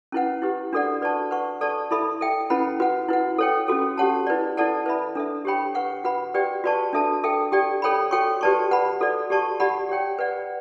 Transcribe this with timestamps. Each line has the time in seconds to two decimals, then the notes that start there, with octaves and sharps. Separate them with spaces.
0.12 C#4 E4 B4 F#5
0.42 E4 G4 B4
0.73 D4 F#4 A4 D5 F#5
1.02 B4 D5 A5 C#6
1.31 B4 F#5 C#6
1.61 A4 D5 A5 C#6
1.91 E4 A4 E5 B5
2.21 A4 E5 G5
2.50 C#4 E4 B4 F#5 B5
2.80 F#4 B4 F#5
3.09 E4 B4 F#5
3.38 A4 C#5 G5
3.68 C#4 F#4 A4
3.98 C#4 G4 C#5 F#5 A5
4.27 E4 B4 D5
4.57 E4 A4 D5 F#5 A5
4.86 B4 E5 B5
5.15 D4 A4 E5
5.45 G4 C#5 G5 B5
5.75 B4 F#5 C#6
6.04 F#4 B4 F#5 B5
6.34 G4 B4 D5 G5
6.64 F#4 B4 D5 A5 C#6
6.93 D4 A4 E5 A5
7.24 A4 E5 G5
7.52 G4 D5 G5
7.82 A4 C#5 G5 B5
8.11 F#4 A4 C#5 G5 C#6
8.41 G4 B4 D5 A5 C#6
8.71 B4 F#5 B5
9.01 F#4 A4 D5
9.30 G4 D5 A5 C#6
9.60 G4 D5 F#5 B5
9.89 G4 C#5 G5
10.19 B4 D5 F#5